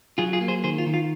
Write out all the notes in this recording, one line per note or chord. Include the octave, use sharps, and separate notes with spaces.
F#3 F4 G#4
F4 G#4
A#3
G#4 C5
D#3 G#4 C5
F4
D#3
F4